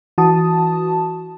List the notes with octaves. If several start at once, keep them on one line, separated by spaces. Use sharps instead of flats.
E3 F#4 A5 D#6